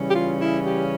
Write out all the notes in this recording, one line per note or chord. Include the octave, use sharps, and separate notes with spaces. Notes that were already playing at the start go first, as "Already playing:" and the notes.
Already playing: C#3 E3 G3 C#4
G4
F4
E4
G4